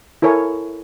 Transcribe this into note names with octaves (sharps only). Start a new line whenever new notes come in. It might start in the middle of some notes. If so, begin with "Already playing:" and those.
E4 A4 A#4 C#5 G#5